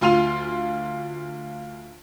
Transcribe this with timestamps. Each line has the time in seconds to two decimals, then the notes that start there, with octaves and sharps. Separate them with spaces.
0.01 D2 F4 C6 D#7 F7